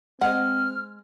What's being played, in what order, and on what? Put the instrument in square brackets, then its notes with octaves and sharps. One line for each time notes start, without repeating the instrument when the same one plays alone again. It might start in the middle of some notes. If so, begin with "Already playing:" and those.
[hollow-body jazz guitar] G#3 D#5 [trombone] C4 [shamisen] F#5 [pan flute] F6